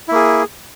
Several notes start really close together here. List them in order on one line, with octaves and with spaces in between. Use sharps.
E4 A#3 G#4